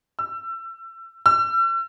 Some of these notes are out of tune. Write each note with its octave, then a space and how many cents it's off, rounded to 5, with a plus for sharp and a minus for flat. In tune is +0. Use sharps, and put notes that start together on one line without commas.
E6 +30
E6 +40